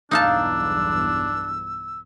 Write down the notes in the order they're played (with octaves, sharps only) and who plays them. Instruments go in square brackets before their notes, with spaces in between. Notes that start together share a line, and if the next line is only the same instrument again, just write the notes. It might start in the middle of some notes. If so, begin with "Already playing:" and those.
[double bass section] B1 E2 G2 [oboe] D4 [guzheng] D#4 F5 A5 [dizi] E6